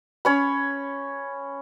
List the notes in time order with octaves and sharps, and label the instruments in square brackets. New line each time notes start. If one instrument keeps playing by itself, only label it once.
[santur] C#4 C#5 B5